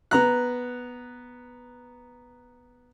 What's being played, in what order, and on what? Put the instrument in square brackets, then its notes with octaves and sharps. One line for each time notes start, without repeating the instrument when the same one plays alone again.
[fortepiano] B3 A#5 F#6